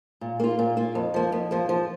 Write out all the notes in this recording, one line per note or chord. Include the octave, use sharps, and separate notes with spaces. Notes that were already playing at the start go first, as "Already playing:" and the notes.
A#2
A#3 F4
A#2
A#3 F4
F2
F3 A#3
F2
F3 A#3
F3